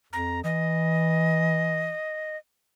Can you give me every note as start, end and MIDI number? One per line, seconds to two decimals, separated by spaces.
0.13 0.42 41
0.13 0.40 82
0.44 1.92 52
0.44 2.37 75